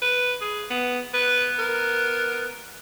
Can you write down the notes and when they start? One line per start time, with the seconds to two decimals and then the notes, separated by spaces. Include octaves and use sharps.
0.02 B4
0.41 G#4
0.71 B3
1.14 B3 B4
1.59 A#4